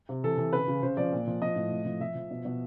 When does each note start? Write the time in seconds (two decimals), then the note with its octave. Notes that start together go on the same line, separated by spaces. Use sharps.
0.09 C3
0.24 E3 A4
0.38 E3
0.53 C#3 B4
0.68 C#3
0.83 C#3 C5
0.97 F3 D5
1.13 A#2
1.27 F3
1.42 F3 D#5
1.56 A2
1.72 A2
1.85 F3
2.01 F3 E5
2.15 F3
2.31 B2
2.45 B2